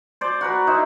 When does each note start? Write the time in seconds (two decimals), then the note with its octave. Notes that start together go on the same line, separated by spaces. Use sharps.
0.21 C5 D5
0.41 F#4 A#4 B4
0.67 D#4 E4 C5